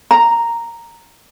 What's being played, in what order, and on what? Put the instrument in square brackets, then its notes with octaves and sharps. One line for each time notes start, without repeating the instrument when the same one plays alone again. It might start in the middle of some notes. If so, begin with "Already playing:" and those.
[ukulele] A#5